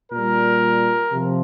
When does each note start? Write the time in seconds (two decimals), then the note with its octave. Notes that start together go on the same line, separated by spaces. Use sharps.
0.12 A#2 G3 A#4
1.13 C3 F3